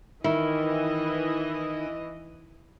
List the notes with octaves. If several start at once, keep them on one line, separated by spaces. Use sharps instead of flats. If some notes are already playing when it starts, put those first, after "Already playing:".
D#3 E3 E4 D#5